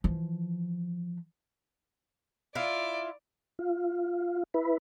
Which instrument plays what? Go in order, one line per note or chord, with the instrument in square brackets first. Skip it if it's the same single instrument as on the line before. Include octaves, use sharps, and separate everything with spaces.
[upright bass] E3 F3
[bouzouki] E4 F4 [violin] D5
[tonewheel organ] F4
E4 B4